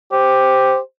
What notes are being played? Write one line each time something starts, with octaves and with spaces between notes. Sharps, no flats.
G4 C5